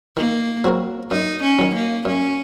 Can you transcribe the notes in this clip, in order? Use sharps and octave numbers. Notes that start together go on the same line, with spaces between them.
D#3 A#3
F#3 C4 F#4 A#4
F#2 D#4
C#4
D#3 F#3
A#3
F#2 C#4